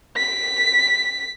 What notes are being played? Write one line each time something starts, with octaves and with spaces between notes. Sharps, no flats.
B6